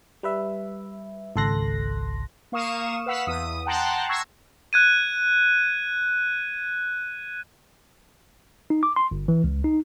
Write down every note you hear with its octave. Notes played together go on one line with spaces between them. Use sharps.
G3 B4 E5
G#1 C#2 A4 C6 F#6 A#6
A#3 F5 C#6 D#6 E7
B4 F5 F#5 E6 B6
E2 D#6
F#5 G5 A5 A#5 C6 F#6
C#6 E6 G#6 A#6 C7
F#6 G#6 D#7
D#4
D6
C6
G1
E3
C#2
D#4